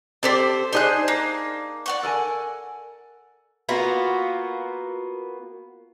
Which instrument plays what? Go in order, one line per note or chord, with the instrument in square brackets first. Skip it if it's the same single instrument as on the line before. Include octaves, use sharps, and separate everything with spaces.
[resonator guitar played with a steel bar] C4 A4 [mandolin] G4 C5 D5
[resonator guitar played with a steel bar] D4 D#4 G#4 [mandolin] C5 G#5 F#6
[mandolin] A#3
D5 F#5 C#6
[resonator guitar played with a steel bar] A4 A#4 G#5
[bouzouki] A#3 B3 F4 F#4